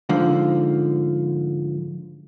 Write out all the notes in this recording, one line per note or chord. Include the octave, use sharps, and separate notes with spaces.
G#2 D3 F3